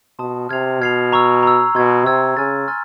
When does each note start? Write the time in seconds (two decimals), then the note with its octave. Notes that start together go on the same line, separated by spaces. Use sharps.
0.19 B2 A5 C6 D#6
0.49 C3 F6 G#6 C7 F7
0.80 B2 F6 G#6 C7 F7
1.12 A#5 C#6 E6
1.43 A#5 C#6 E6
1.75 B2 C6 E6 G#6
2.05 C3 C6 E6 G#6
2.37 C#3 G#5 C6 F6 A6
2.68 G#5 C6 F6 A6